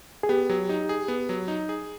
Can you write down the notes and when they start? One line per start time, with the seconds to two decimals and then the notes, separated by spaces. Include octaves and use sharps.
0.23 G#4
0.29 B3 G4
0.49 F#3
0.69 D#4
0.89 G#4
1.08 B3
1.29 F#3
1.48 D#4
1.69 G#4